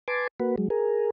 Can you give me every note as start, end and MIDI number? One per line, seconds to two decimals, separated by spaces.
0.08 0.27 71
0.08 0.27 80
0.08 0.27 81
0.08 0.27 84
0.08 0.27 86
0.40 0.56 58
0.40 0.56 66
0.40 0.56 71
0.58 0.68 54
0.58 0.68 56
0.70 1.10 68
0.70 1.10 70